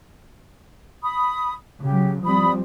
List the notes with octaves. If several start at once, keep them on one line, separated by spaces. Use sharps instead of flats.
B5 D#6
C#3 F#3 G4
F3 G3 C4 D5 B5 D#6